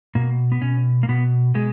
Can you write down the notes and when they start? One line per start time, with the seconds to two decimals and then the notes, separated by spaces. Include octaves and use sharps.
0.15 B2 A#3
0.52 B3
0.62 B2 C#4
1.03 A#3
1.08 B2 B3
1.54 B2 G#3